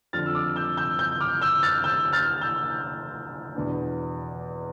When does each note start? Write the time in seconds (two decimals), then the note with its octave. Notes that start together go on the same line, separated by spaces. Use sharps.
0.13 F2 D3 F3 F6 A6
0.26 E6
0.35 D6 F6
0.56 E6 G6
0.77 E6 G6
0.99 E6 G6
1.21 D6 F6
1.41 E6 G6
1.63 F6 A6
1.84 E6 G6
2.13 F6 A6
2.41 E6 G6
3.55 E2 B2 B3 D4